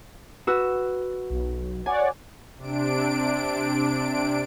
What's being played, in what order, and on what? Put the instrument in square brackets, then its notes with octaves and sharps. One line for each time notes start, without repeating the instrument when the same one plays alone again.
[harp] F#4 B4 E6
[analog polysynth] B1
[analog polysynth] C#5 D5 F#5 [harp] G#5
[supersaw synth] C3 D4 D7